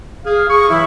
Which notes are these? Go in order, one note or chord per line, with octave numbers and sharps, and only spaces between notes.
G#4 F5
G#4 C#6
E3 F#3 E4